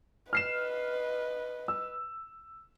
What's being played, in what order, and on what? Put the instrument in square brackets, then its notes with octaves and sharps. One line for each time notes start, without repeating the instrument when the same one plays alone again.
[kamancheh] B4 D#5 [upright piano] F6 C7 E7
[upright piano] E6